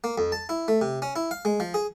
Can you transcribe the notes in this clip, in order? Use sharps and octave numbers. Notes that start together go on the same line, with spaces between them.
A#3
F2
A5
E4
A3
C3
C#4
E4
F5
G#3
F3
G#4